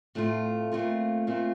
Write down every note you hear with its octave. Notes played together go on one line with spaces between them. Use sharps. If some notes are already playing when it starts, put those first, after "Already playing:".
A2 A3 C4 F4
A#2 A3 C4 F4
A#2 A3 C4 F4